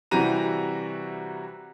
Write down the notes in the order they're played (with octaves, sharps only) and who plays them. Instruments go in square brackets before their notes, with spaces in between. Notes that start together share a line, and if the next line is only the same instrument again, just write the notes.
[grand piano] C3 E3 G3 F#4 A#5 D#7